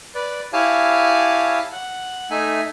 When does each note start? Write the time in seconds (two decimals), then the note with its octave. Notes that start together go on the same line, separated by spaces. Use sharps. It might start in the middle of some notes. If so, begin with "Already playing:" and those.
0.15 B4 D5
0.53 E4 G4 C#5 F5 G#5 A5
1.72 F#5
2.31 A3 D#4 E5 G#5